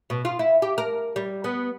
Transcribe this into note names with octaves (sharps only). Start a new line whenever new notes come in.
B2
F4
E4
G4
A#4
G3
B3